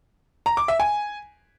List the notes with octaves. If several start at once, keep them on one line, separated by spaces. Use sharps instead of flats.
A#5
D6
E5
G#5